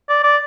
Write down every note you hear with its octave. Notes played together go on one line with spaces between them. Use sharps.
D5
D5